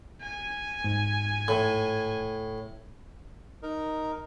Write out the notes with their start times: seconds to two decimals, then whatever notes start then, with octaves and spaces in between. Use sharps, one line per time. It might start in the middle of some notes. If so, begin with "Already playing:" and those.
0.22 G#5
0.84 G#2
1.48 A2
3.63 D#4 A#4